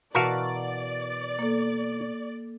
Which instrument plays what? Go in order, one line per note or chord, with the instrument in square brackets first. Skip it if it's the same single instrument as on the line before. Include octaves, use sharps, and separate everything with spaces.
[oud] B2 E5 F5 [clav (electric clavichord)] E3 F#4 A#4 [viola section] D5 [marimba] A5
[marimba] A#3 A4